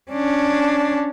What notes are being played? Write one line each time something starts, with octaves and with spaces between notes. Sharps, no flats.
C#4 D4